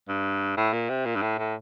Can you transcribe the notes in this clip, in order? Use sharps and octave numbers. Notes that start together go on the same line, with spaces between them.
G2
A2
A#2
C3
A#2
G2
A2
A2